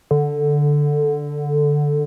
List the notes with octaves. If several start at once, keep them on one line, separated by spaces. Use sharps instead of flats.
D3